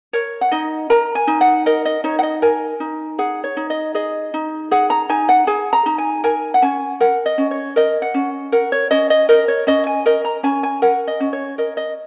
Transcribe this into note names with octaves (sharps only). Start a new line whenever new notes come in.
A#4 C#5
F#5
D#4 D#5
A#4 A#5
G#5
D#4
F#5
A#4 D#5
D#5
D#4 C#5
F#5
D#5
A#4 G#5
D#4
G#4 F#5
C#5
D#4
D#5
G#4 D#5
D#4
G#4 F#5
A#5
D#4 G#5
F#5
G#4 G#5
A#5
D#4
G#5
A#4 G#5
F#5
C#4 G#5
A#4 F#5
D#5
C#4
C#5
A#4 D#5
F#5
C#4
A#4 F#5
C#5
C#4 D#5
D#5
A#4 D#5
C#5
C#4 D#5
G#5
A#4 D#5
A#5
C#4 G#5
G#5
A#4 F#5
D#5
C#4
C#5
A#4 D#5
D#5